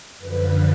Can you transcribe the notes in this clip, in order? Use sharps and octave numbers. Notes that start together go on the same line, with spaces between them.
F#2 D3 F3 B4